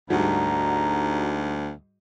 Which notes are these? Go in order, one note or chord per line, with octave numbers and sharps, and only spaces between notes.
D2 G#2 G3 F#4 A#5